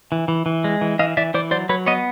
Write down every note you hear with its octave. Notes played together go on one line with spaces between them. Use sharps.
E3
E3
E3
G#3
E3
E3 D#5 F5
E3 D5 E5
E3 C5 D5
F#3 C5 D5
F#3 B4 C#5
B3 C#5 D#5